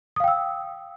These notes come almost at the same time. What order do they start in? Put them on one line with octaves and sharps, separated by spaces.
D#6 F5 G5 E6